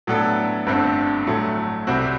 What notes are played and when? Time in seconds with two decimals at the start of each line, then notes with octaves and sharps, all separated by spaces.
0.07 A2 F#3 B3 D4 A4
0.67 G1 G2 D3 A3 C4
1.27 A2 F#3 A3
1.87 C2 C3 G3 C4 F#4